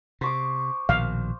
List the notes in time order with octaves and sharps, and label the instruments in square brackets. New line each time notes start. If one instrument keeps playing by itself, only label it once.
[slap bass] C3 [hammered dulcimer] C5 C#6 D6
[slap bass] A#1 B2 D#3 [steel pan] F5